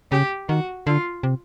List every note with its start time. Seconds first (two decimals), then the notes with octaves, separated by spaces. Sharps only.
0.11 C#3 G4
0.49 D#3 F#4
0.87 D3 F4
1.23 C3